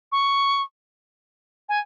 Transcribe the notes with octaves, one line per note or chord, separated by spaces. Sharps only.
C#6
G#5